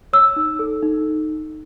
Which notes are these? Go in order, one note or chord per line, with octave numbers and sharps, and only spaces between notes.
C#5 E6
D#4
A4
D#4